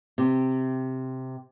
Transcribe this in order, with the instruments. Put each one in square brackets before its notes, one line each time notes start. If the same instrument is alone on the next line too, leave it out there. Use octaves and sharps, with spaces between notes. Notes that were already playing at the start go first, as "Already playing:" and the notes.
[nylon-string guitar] C3 G4